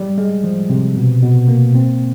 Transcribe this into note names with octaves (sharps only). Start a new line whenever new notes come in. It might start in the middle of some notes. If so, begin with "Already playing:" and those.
Already playing: G3
G#3
F3
C3
B2
B2
A#3
C4